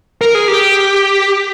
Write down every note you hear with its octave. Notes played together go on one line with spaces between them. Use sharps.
A#4
G#4
G4